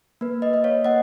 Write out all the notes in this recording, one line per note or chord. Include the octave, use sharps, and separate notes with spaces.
A#3 B4
B4 D#5
A#3 D#5
C#5 F5
A#3 D#5 F#5